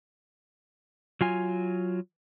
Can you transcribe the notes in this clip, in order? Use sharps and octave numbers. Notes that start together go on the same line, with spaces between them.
F#3 F4 G#5